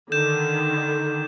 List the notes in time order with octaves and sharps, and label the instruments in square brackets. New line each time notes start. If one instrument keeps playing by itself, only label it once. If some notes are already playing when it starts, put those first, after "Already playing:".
[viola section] D3 D#3 [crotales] G6 E7